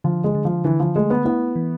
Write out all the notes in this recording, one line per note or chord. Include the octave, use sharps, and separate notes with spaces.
D3 F3
G#3
D3
F3
D3 E3
F3
G#3 A3
B3
B3 E4
E3